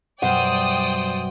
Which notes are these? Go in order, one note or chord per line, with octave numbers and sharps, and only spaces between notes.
F#2 B2 G3 C5 D5 F#5 G5 D#6